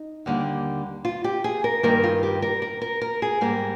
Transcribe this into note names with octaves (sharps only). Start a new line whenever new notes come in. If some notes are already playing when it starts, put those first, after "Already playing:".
Already playing: D#4
D#2 D3 G3 A#3
F4
G4
G#4
A#4
G2 D#3 G3 A#3 A#4
F4
G4
A#4
A#4
A#4
A#4
G#4
G#2 G3 A#3 A#4